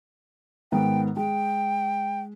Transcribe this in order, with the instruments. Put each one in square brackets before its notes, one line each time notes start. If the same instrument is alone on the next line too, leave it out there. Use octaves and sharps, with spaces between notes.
[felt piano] G#2 D#3 B3 [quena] G5
[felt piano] G#3 [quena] G5